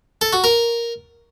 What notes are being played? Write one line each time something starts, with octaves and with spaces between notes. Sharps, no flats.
A4
F#4
A#4